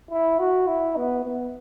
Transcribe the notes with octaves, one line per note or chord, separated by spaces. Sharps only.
E4
F#4
E4
B3
B3